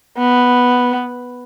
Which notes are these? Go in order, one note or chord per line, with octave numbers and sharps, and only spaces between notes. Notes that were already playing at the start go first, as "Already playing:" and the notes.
B3